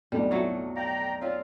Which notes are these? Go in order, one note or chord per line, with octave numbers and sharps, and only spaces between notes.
B1 F2 A2 G3 D4 A4
F#3 A3 D4 E4 F4
D5 F5 G5 A#5
C4 F4 C#5 D5